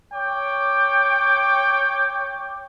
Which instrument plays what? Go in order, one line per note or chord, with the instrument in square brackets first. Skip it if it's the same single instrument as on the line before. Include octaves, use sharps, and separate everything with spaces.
[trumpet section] C#5 G5 D6